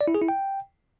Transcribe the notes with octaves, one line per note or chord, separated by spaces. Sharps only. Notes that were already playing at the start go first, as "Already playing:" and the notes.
D5
E4
G#4
E4
G5